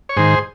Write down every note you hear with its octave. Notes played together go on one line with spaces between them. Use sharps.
C#5
G#2 D#3 G#4 C5